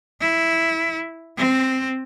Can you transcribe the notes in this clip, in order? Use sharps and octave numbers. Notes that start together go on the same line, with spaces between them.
E4
C4